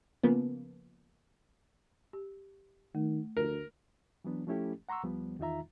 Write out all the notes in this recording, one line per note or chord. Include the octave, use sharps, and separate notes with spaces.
C#3 F3 A#3 B3
G4
D#3 A3
D2 A#4
E3 F#3 B3 D4
F3 A3 C#4 E4 G4 A4
F#5 A#5 C6 C#6 E6
D2 F3 G3 B3
E2 D#3 D#4 F4 E5 A#5